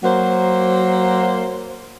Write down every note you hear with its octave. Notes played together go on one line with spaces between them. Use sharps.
F#3 A#3 C5